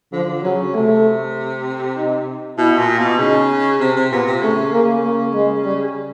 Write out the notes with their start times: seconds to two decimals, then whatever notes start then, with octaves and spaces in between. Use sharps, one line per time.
0.12 D3 F3
0.43 C#3 F#3
0.74 C3 A3
1.97 D#4
2.57 B2 E4
2.78 A#2
2.99 B2
3.19 C#3 D#4
3.80 C3 C4
3.96 C3
4.12 A#2 B3
4.27 C3
4.41 C#3 A3
4.73 C#3 A#3
5.03 A#3
5.34 G#3
5.64 G3